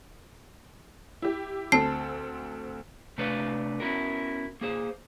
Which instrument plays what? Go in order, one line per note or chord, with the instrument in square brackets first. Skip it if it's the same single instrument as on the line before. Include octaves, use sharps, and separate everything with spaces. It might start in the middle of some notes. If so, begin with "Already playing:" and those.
[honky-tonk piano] E4 G4
[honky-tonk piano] D2 C4 A4 [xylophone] A5 C7
[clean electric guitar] C3 A3 D4 B4 D5 F5
B3 C#4 E4 F#4 A#4
A#3 G#4 C5